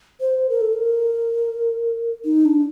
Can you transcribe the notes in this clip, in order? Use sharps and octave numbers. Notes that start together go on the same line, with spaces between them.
C5
A#4
A4
A#4
D#4
D4